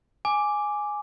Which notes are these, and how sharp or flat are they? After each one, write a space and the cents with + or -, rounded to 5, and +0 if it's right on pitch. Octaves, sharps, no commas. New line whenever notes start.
G#5 +0 D6 +0